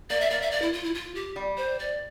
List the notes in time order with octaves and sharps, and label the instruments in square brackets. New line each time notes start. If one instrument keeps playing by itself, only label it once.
[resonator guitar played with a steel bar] A#3 [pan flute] D5
[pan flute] E5
[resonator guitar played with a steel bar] A#3 [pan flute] D5
[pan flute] E5
D5
E4
F4
E4
F4
G4
[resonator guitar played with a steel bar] G3
[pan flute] C5
D5